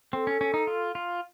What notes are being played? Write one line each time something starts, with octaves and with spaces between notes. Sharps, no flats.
C4 A4
C#4
C#4
D#4
F4
F4